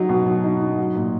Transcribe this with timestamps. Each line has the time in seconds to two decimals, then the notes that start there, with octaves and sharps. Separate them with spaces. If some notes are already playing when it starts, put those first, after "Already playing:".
Already playing: F#3 D#4
0.09 B2
0.26 F#3
0.44 D#4
0.61 D#4
0.78 F#3
0.96 A#2